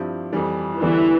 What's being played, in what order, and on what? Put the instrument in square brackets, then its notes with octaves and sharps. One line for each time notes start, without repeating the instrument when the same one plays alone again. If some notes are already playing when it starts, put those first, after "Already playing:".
Already playing: [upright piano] G2 F3 C4 E4 G4
F2 E3 G3
[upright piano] E2 D3 G3 D4 [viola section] E3